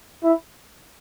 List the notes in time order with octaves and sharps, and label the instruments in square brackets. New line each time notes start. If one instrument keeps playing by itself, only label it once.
[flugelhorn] E4